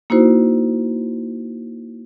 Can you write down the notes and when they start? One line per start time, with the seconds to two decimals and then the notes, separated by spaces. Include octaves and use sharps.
0.10 A#3 D#4 E4 F#4 C5